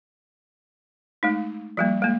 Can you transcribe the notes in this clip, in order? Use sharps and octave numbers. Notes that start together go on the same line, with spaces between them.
G#3 A3 D#4
F3 G3 A#3
G#3 A#3